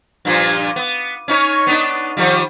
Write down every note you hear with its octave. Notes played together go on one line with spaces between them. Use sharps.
G2 A#2 F3
B3
C#4 D#4 C#5
B3 D4 D#4
D#3 F3 G3